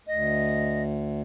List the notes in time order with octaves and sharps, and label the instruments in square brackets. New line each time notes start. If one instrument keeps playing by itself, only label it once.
[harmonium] D2 [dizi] D#5